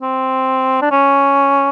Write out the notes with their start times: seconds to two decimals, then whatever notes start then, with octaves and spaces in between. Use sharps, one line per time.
0.02 C4
0.82 D4
0.91 C#4